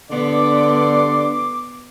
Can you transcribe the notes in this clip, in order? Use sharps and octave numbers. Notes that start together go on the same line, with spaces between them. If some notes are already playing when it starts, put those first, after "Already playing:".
G2 D3 B3 D5 C6 D6